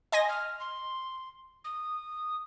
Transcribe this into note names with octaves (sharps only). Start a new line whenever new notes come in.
D#5 G#5 C6 A#6
F6
C6
D#6